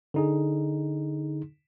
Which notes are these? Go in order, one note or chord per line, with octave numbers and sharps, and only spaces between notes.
D3 D#4 G#4